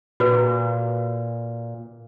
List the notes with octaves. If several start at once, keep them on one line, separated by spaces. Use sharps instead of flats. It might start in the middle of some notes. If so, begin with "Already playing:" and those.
A#2 F#4 B4